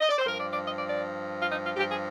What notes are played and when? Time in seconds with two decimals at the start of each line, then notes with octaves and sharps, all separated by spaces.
0.01 D#5
0.09 D5
0.18 C5
0.26 G2 F3 A#4
0.38 D5
0.51 D5
0.64 D#5
0.76 D5
0.89 D5
1.39 F4
1.51 D#4
1.64 F4
1.76 G2 F3 G4
1.89 G#4